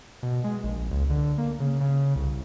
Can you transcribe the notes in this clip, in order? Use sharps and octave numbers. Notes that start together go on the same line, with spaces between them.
B2
G#3
A#1
C#2
D3
A#3
C#3
C#3
C2